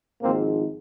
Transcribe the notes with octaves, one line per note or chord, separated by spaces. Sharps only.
G#1 G#2 F3 G#3 A#3 C4